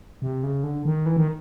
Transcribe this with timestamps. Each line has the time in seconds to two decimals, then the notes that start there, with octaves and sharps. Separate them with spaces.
0.22 C3
0.43 C#3
0.63 D3
0.85 D#3
1.06 E3
1.17 D#3